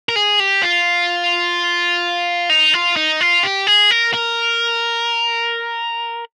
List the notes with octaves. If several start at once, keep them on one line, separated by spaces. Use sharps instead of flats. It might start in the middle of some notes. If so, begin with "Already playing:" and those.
A#4
G#4
G4
F4
D#4
F4
D#4
F4
G4
G#4
A#4
A#4